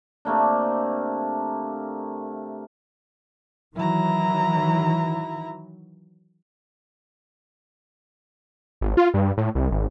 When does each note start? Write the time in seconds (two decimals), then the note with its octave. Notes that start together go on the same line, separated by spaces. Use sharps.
0.25 C3 A3 A#3 D4
3.76 D#3 E3 F#3 E4 A#5
8.81 G#1
8.97 F4
9.14 G2
9.37 A2
9.55 C2
9.71 G#1